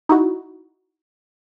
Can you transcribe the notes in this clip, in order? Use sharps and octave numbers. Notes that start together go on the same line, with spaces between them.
D#4 E4 F#4